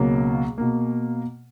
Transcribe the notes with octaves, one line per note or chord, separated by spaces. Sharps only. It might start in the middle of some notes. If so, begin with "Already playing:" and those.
Already playing: C#2 B2 F#3 A#3
B2 A#3